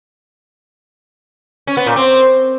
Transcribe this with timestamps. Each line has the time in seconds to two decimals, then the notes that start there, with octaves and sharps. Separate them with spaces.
1.67 C#4
1.77 B3
1.86 A#2
1.96 C4